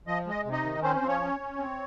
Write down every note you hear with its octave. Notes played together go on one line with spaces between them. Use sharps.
F3 D#5
G#3 D#5
C3
D#4 D#5
D#3
C4 C#4 C5
C4 C5
F3
C#4 C#5
C#4
C#4
C4